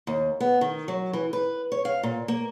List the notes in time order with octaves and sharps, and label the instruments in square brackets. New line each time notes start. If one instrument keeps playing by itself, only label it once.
[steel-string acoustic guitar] D#2
B3
D#3
F#3
E3
B4
C#5
F5
A#2
A#3